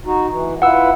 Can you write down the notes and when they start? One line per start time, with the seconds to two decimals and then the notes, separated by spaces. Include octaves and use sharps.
0.05 D#4 F#4
0.31 E3
0.62 E4 F4 B4 F#5 E6